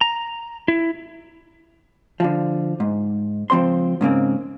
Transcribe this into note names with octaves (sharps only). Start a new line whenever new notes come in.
A#5
E4
D3 F3
G#2
C#2 F3 C4 C5 C6
G#2 C#3 A#3 C4